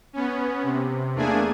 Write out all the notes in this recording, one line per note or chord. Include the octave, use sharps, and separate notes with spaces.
B3 C#4
C3
E2 A3 A#3 D4 G#4 G#5